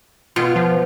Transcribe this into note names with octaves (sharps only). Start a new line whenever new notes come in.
B2 F4
F3